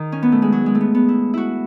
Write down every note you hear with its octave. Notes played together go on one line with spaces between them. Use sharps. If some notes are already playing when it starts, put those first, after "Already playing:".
Already playing: D#3
C#4
B3
A3
G#3
F#3
G#3
A3
B3
B3
E4
E4 F#4